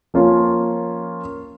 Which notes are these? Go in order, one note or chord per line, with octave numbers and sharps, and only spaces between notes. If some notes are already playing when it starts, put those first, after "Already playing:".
F3 A#3 C#4 F4